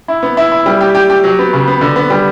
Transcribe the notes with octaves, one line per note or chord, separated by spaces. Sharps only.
E4
B3
E4
E4
G3
G4
G4
G4
F#3
B3
C#3
B3
D3
B3
G3